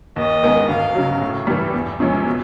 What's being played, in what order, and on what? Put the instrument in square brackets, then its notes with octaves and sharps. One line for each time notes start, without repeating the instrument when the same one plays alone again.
[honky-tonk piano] D#2 [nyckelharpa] D#5
[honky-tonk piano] D#3 G#3 B3 D#4
[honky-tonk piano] D2 [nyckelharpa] F5
[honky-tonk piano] C#3 F#3
A2
E3 G3
E2
C3 F3 G#3 C#4
B2